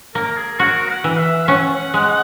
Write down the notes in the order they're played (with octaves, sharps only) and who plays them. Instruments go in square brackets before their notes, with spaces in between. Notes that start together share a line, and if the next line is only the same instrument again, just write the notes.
[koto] A#3 [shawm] A#4
[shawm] G#4
[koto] F#4 [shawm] A#4
[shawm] F#5
[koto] E3
[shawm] E5
[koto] C#4 [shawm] F#5
[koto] G#3